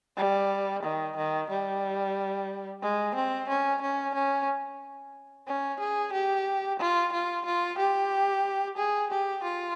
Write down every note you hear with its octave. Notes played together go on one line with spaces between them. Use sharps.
G3
D#3
D#3
G3
G#3
C4
C#4
C#4
C#4
C#4
G#4
G4
F4
F4
F4
G4
G#4
G4
F4